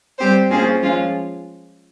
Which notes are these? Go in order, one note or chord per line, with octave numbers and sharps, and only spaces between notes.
G3 C4 G4 C5
A#3 C#4 F4 G#4 C5
F3 G#3 C#4 F4